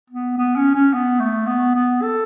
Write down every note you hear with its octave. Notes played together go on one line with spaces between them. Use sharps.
B3
B3
C#4
C#4
B3
A3
B3
B3
A4